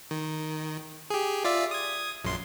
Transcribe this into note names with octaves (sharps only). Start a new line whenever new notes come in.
D#3
G4 G#4
F4 D5 E5
D#6 G#6
A#1 F#2 C6